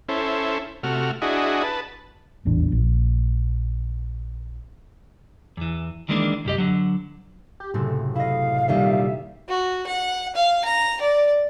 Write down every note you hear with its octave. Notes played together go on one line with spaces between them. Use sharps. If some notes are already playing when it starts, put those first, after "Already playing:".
C#4 E4 A4 C5
C3 A3 F#4 F6
D4 E4 F#4 G#4 D#5
B4 A5
D#1 A1 E2 D4
A#1
E2 E3
D#3 E3 G#3 A#3 D4
C2 F#2 G4 D#5
D3 F#3
G4
F#1 A2 C3 A4
E4 D#5 F5
A#2 D#3 G3 E5
F#4
F#5
F5
A#5
D5